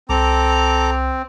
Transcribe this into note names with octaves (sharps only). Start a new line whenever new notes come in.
C2 C4 A4 A#5 D6